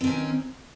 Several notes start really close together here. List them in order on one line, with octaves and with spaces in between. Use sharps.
C4 D#3 C#4